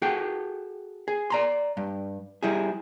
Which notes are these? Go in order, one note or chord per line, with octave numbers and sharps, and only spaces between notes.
F#4 G#4 A4 G5
G#4
D5 A#5 C6
G2
G3 E4 G#4